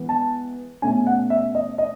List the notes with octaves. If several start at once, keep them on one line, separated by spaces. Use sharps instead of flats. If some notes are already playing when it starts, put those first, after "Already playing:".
Already playing: E3 G#3 B3
A5
B2 A3 C#4 G#5
F#5
E5
D#5
D#5